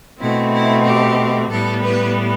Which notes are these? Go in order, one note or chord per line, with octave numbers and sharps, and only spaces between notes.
B2 A3 C4 E4
E4
G4
A2 G3 B3 A4
B4